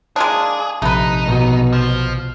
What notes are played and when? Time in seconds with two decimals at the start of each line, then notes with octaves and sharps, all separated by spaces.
0.16 G#3 A#3 D4 G#4
0.82 A#1 C3 A3 D#4 B4
1.27 B2
1.73 F3